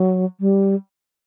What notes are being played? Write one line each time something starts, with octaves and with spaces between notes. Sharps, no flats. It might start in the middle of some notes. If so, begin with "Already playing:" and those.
Already playing: F#3
G3